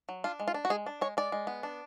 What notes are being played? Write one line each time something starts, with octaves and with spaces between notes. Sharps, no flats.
F#3
D4 F4
G#3
F4
D4
F#4
G#3 G#4
D4
G#3 C#5
G#3 D5
G#3
B3
D4